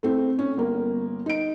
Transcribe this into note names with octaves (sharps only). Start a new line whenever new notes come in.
A3 C4 E4
C#4
G1 A#3
D#4 D7